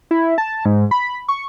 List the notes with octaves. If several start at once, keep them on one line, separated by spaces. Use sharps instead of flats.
E4
A5
G#2
B5
C#6